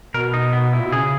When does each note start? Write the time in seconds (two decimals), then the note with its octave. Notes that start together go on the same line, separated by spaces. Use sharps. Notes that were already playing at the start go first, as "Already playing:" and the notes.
0.14 B2 A#4
0.34 D#4
0.53 B3
0.73 E4
0.78 A#2
0.85 B2
0.92 C#3 G#4